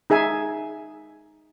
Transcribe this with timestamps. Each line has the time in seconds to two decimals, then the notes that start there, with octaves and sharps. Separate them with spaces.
0.10 D#4 G#4 E5 G#5